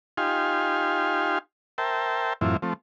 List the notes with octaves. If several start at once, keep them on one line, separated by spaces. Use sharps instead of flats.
D#4 F4 G4 F5 G#5 C6
A#4 C5 E5 G5 A5
F#2 A2 E3 C4 E4 F4
F3 A3 C4